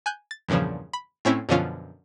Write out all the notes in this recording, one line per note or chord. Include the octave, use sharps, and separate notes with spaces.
G#5 F#6 G6
A6
E2 G2 A#2 C#3 F3
B5
A2 C4 C#4 E4
F#2 B2 D3 F3 C#4 F4